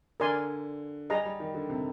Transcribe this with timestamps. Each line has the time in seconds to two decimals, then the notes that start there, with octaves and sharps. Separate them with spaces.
0.20 D3 A#4 D5 G#5 C6
1.10 G3 G#4 D#5 A#5
1.25 G3
1.40 D#3
1.55 D3
1.70 C3